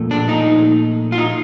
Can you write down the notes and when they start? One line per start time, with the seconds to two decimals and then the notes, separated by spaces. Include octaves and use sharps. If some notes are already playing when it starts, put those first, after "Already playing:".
Already playing: A#2 F3 A3
0.11 D4
0.29 D#4
1.12 F4
1.18 D#4